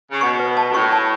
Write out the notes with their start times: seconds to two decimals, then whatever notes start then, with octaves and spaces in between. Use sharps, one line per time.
0.11 C#3
0.21 B2 C#6
0.40 B4
0.57 A5
0.71 F#2
0.74 A2 C#6
0.92 A5